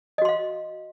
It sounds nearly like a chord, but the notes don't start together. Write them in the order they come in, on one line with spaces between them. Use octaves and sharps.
D#5 F#4 C6 F5